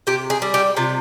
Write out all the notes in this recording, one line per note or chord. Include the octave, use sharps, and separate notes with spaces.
C3 G4
G#4
G3
G4
C3 F4